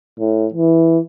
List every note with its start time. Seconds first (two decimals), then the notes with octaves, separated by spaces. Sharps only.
0.19 A2
0.54 E3